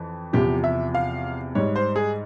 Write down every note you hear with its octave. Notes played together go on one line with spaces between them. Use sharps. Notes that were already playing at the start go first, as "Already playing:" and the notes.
Already playing: F2 E3
E2 C3 F3 G4
E5
F5
G#2 G3 C#5
C5
G#4